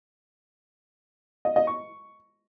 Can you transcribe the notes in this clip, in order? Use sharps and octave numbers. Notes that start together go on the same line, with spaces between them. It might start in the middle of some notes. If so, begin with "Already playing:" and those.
D#5
D#5
C#6